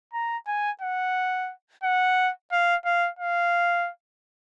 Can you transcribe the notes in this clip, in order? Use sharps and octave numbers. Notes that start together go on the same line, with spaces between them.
A#5
G#5
F#5
F#5
F5
F5
F5